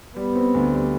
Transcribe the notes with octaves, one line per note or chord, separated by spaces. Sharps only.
G3 B3
C4
D2
G3